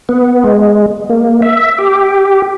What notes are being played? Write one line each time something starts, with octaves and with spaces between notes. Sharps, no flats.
B3
G#3
A#3
E5
G4